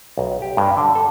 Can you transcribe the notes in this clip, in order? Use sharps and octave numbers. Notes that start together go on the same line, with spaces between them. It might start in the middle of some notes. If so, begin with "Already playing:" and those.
B1
G4
G2
D3
A4